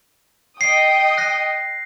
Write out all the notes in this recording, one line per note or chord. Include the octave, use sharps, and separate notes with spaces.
D#5 G5 D#6 C7
F#6 A#6 C7